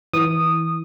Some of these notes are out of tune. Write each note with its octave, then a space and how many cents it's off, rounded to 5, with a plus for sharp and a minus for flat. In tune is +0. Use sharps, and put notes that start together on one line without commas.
E3 -20 D#6 -10